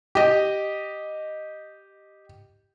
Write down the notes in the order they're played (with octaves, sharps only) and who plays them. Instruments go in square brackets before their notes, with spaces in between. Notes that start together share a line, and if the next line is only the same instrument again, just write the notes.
[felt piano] G4 D#5